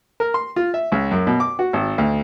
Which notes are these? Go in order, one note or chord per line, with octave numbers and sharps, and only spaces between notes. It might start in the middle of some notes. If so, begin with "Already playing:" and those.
A#4
C6
F4
E5
C#2
F#2
B2
D6
F#4
G#1
D2